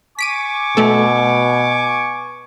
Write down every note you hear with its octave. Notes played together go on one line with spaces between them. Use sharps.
G#5 C#6 D6 B6 D7 D#7
B2 A3 A4